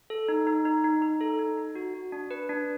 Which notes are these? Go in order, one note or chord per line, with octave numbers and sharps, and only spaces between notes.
A4
D#4
D#4
D#4
D#4
D#4
A4
D#4
D#4
F#4
F#4
D4
B4
D4